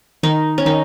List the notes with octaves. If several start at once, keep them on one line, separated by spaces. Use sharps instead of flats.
D#3 D#4
C#4
D#3 D#4